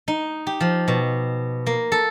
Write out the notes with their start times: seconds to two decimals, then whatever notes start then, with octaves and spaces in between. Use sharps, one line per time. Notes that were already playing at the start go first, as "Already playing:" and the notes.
0.08 D#4
0.47 G4
0.60 F3
0.88 B2
1.67 A#3
1.92 A4